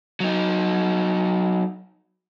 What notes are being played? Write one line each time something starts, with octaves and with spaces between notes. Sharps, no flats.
F#3 D#4